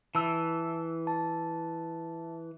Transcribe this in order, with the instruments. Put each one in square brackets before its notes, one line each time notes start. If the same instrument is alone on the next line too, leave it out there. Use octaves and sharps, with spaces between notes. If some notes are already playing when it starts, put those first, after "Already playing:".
[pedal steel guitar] E3 [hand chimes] A5 E6
[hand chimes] A5